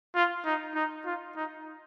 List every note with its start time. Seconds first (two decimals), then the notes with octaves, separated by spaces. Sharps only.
0.15 F4
0.45 D#4
0.75 D#4
1.05 F4
1.36 D#4